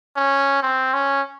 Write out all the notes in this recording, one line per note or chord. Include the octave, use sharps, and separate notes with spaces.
C#4
C4
C#4